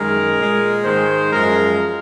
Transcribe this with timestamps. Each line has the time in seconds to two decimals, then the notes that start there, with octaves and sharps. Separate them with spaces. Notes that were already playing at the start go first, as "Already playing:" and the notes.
Already playing: F#2 D#3 G#3 A#4
0.36 A#2 G#3
0.84 G#2 D#3 G#3 C5
1.32 F#2 F3 G#3 A#4